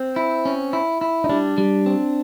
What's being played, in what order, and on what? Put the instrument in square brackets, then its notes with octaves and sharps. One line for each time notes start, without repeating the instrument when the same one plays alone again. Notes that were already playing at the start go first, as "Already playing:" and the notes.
Already playing: [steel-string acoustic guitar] C4
[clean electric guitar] E4
C#4
E4
E4
[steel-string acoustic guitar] D#4
[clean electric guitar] G3 [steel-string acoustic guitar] D4
[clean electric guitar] G3
C4